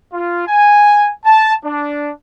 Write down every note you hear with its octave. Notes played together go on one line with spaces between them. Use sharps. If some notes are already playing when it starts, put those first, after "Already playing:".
F4
G#5
A5
D4